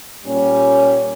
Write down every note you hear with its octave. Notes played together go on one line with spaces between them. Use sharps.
A#2 G3 C#4